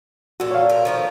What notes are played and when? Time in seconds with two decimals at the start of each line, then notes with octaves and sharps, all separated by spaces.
0.40 A#2 F#4 A4
0.51 C#5 F5
0.69 A#4
0.85 D#3 F3 A3